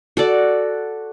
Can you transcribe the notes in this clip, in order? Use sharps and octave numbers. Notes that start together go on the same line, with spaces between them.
F#4 A4 D5